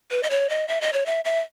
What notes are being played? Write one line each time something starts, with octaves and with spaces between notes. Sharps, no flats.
B4
D#5
C#5
D#5
E5
D#5
C#5
E5
E5